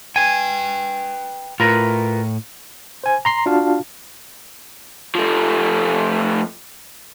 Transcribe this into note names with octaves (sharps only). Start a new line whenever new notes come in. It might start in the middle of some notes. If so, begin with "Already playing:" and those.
B4 G5 G#5
A2 F4 A#4 B4
C5 G#5
A#5 C6 C7
D4 F4 F#4 F5 A5
F3 A3